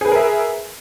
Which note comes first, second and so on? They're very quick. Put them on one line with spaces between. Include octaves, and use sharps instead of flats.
G#4 B4 G#5 A#4 E5